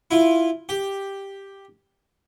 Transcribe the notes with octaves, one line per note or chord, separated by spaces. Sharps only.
E4 F4
G4